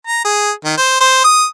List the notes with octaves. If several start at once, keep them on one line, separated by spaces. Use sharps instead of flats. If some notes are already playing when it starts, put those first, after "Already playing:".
A#5
G#4
D#3
C5
C5
D#6